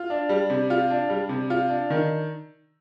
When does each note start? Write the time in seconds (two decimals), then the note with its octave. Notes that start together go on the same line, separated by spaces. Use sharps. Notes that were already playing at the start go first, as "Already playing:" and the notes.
Already playing: F4
0.10 D4
0.29 G3
0.50 C3
0.70 F4
0.90 D4
1.10 G3
1.29 C3
1.50 F4
1.70 D4
1.90 D#3